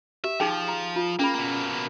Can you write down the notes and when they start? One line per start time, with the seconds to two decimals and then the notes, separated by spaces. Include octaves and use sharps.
0.24 G4 E5
0.40 F3 D#4 G#4 G5
0.68 A#5
0.96 F4
1.19 A#3 C#4 G#4 B5
1.35 B2 A#3